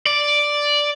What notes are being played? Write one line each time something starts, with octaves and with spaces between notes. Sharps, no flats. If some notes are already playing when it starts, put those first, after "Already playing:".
D5